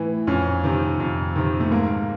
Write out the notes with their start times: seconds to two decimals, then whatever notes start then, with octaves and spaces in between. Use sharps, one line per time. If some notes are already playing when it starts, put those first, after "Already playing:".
Already playing: A2 E3
0.27 F2 C#4
0.64 C3 D#3
1.00 F2
1.36 C3 D#3
1.60 A3
1.71 G#2 A#3